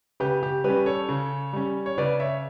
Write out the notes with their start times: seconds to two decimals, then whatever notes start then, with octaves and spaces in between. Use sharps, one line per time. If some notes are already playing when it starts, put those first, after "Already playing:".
0.20 C#3 G4 B4
0.43 G4
0.64 G3 C#4 G4 B4
0.86 A4 C#5
1.09 C#3
1.53 G3 C#4
1.86 C#5
1.98 C#3 B4 D5
2.20 C#5 E5